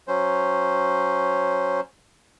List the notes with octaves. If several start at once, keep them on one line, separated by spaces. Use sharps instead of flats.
F#3 C#4 C5